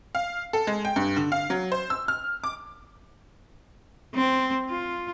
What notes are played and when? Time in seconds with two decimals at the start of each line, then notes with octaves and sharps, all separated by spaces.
0.15 F5
0.53 A4
0.67 G#3
0.85 G5
0.96 G2
1.16 D3
1.32 F5
1.50 F#3
1.72 C5
1.90 E6
2.08 F6
2.44 D6
4.15 C4
4.70 F4